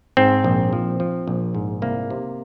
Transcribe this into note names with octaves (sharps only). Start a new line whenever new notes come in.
G#2 C4
A#1
F3
F3
A#1
G#2
C2 A#3
C3